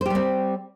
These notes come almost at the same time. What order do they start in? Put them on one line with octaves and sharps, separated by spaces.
C5 G4 G3 C4